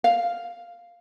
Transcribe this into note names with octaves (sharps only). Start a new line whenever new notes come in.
F5